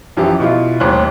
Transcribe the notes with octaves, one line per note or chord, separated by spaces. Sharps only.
F#2 E3 F3 G4
B2 E4 F4
D#1 A1 D#2 C5 F#6